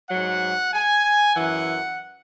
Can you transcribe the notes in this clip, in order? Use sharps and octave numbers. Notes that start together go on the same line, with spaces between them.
G#2 F#3 F#5
G#5
F#2 E3 F#5